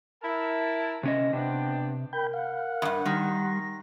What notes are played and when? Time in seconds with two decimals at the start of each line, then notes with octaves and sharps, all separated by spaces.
0.23 E4 A#4 A5
1.03 C3 C#4 D#5
1.33 C3 B3 D4 G5
2.13 A#4 G5 B5 G6
2.34 F5 F#5
2.82 E2 G2
3.06 D#3 G3 C6 A#6